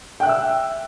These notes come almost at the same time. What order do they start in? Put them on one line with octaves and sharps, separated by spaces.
G5 F#6 E5 E6